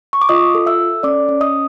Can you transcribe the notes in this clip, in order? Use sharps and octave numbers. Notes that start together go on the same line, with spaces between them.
C#6
D6
F4 D#5 D#6
A4
E5 E6
A4
C#4 D5 D6
C#4
D#5 D#6